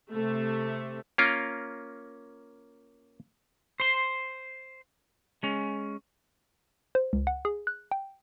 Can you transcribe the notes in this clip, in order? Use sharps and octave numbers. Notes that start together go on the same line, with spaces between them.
C3 A3
A#3 C#4 F4 A#4
C5 C6
G#3 C#4
C5
C#2
F#5
G#4
F#6
G5